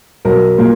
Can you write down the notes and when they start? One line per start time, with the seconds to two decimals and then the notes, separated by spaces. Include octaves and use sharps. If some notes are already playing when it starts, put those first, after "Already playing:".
0.25 B1 A#4
0.58 A#2 A#3